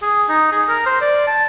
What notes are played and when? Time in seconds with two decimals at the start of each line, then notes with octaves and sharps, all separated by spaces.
0.02 G#4
0.29 D#4
0.52 G#4
0.69 A#4
0.87 C5
1.01 D5
1.28 A5